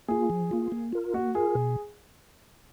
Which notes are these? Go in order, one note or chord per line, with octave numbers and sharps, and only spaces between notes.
A#3 F4 G#4
F3
A#3 F4
A#3
F4 A#4
A#3 F#4
F4 G#4 A#4
B2